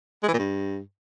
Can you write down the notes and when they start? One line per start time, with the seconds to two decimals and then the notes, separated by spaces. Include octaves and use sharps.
0.23 G#3
0.28 E3
0.33 A#2
0.39 G2